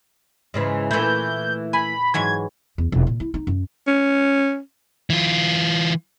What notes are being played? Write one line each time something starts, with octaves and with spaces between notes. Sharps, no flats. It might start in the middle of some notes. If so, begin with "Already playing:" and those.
G#2 C#3 E3
A#2 E3 A3 E4 G6
G#5 B5
G#2 E3 F#3 G#6
E2
E1
A#2
E4
D#4
F#2
C#4
E3 F4